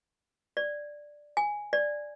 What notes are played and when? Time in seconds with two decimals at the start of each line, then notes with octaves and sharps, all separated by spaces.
0.57 D5
1.37 G#5
1.73 D5